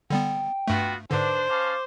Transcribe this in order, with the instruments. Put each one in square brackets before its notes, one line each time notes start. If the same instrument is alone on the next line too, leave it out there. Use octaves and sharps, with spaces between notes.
[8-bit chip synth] D3 G3 B3 [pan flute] G5
[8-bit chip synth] G2 A3 [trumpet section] B3 F4 F#4
[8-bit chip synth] G#2 D3 [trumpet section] D4 [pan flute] B4 [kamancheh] C5
[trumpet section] C#4 F5 A5 [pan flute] D6